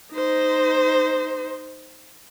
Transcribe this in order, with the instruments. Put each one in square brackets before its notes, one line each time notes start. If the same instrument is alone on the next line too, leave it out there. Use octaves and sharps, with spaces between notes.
[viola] D#4 C5